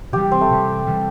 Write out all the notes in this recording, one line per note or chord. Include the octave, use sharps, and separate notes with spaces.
C3 E3 G3 G4
C4
A3
C3 E3 G3
C3 E3 G3